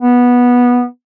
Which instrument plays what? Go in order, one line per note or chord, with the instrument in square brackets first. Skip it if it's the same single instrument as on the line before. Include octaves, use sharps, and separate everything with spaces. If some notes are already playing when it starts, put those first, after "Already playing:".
[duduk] B3